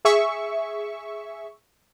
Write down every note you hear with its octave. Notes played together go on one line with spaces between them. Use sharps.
G#4 E5 C#6